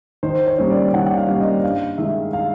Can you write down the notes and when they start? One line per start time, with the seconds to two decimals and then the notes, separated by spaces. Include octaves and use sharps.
0.23 D#3 C5
0.47 C#5
0.58 G3 A#3 C#4
0.71 D5
0.93 D#3 F#5
1.06 F#5
1.17 F5
1.28 G3 A#3 C#4
1.40 D#5
1.63 G2 F5
1.98 D#3 G#3 E5
2.33 F5